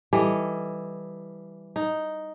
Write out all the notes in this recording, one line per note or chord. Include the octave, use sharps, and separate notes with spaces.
E3 G3 A4 D#5
D#4